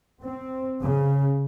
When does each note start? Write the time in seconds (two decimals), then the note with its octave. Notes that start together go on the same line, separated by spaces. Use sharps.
0.21 C4
0.82 C#3